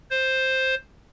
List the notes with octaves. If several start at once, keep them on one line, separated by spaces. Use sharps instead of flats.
C5